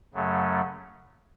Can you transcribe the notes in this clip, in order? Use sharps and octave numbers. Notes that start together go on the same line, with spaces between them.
F#2 C#3 F#3 A3